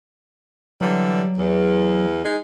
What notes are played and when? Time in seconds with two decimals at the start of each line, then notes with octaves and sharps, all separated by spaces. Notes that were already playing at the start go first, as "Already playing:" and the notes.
0.81 D3 E3 F#3 G3
1.38 E2
2.24 G#3 D#4